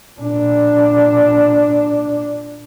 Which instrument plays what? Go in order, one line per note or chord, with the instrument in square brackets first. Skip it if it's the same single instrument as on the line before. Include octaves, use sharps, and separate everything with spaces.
[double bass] A#2 D4